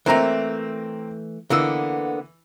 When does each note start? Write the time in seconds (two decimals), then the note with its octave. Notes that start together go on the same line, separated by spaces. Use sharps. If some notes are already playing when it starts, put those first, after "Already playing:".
0.06 E3 A3 A#3 C4 A#5
1.50 D3 E3 A#3 B3 E6